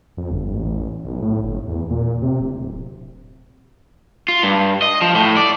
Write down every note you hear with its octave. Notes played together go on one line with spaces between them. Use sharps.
F2
G1
A1
B1
A2
G1
E2
A#2
C3
D1
F4
G2
D#5
F3
A2
D5